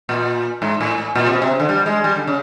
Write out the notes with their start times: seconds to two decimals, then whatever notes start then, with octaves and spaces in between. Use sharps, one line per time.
0.09 A#2
0.62 G#2
0.81 A2
0.98 A2
1.15 A#2
1.26 C3
1.33 B2
1.42 C3
1.51 C#3
1.60 D3
1.69 G3
1.86 G#3
2.04 G3
2.15 D3
2.27 C#3